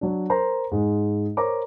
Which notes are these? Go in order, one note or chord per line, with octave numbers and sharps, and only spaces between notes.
F#3 D4
A#4 C5 A#5
G#2 G#3
A#4 C5 C#5 A#5 D6